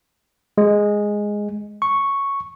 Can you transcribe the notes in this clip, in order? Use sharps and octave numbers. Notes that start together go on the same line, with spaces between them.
G#3
C#6